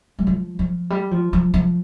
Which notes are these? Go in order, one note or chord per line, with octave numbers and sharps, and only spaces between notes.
G3
F3
F3
G3
F3
F3
F3